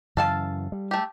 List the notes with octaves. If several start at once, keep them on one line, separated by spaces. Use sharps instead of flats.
F#2 C#3 E3 A4 F5 A5
G3
A3 G4